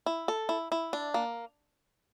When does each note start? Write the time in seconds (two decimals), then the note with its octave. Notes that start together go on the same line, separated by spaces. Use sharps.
0.06 E4
0.28 A4
0.49 E4
0.72 E4
0.93 D4
1.14 A#3